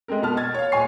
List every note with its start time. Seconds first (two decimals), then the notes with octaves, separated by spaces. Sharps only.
0.08 G#3 A3 C4 A#4
0.22 B2 B3 A5 F6
0.37 G#6 A6
0.55 C#5 F5
0.72 D#1 C#5 G#5 C#6 C7